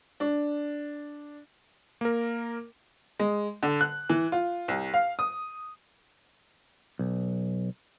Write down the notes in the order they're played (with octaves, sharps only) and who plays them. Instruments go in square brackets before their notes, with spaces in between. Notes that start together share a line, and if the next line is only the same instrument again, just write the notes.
[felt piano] D4
[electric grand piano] A#3 A#4
[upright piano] G#3
D3
F#6
E3
F4
C2
F5
D#6
[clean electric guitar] B1